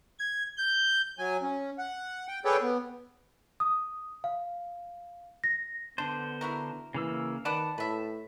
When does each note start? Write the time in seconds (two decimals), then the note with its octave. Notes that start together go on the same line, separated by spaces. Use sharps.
0.19 G#6
0.57 G6
1.19 F#3 G#5
1.42 C#4
1.78 F#5
2.28 G5
2.45 G#4 A4 B4 C#5 D5 G5
2.62 B3
3.60 D#6
4.24 F5
5.44 A#6
5.98 D3 B3 D4 C5
6.41 E4 F#4 A#4
6.94 C#3 E3 A#3 E6
7.45 D#3 B4 D5 F#5 A5
7.78 A2 B4 E5